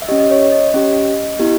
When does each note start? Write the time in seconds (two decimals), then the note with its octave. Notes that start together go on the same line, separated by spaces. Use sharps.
0.02 E5
0.09 C#4 G4 D#5
0.20 D#5
0.30 C#5
0.52 D#5
0.74 C#4 G4
1.39 B3 E4 G4